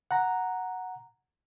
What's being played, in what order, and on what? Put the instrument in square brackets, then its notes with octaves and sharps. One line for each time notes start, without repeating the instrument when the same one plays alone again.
[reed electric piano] F#5 A#5